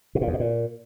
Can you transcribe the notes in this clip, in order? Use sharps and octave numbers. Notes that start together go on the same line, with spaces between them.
B2
A#2
E2
B2
A#2